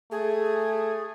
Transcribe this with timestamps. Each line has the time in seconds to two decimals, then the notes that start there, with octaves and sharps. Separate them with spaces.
0.11 A3 G#4